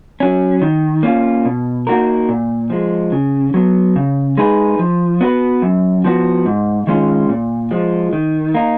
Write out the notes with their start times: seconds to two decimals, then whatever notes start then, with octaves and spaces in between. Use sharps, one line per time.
0.20 F#3 C#4
0.62 D#3
1.03 A#3 C#4 F4
1.45 B2
1.87 A#3 D#4 F#4 A#4
2.29 A#2
2.70 F3 G#3
3.12 C#3
3.54 F#3 B3
3.96 C#3
4.37 G#3 D#4 G#4 B4
4.79 F3
5.21 B3 F#4 B4
5.62 F#2
6.04 F3 B3 F#4
6.46 G#2
6.87 D#3 G#3 C#4 F4
7.29 A#2
7.71 F3 G#3
8.13 D#3
8.54 A#3 D#4